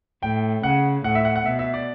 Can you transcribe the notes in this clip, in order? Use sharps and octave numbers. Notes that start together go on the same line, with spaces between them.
A2 G5
C#3 F#5
A2 F#5
E5
F#5
F#5
B2 E5
E5
D5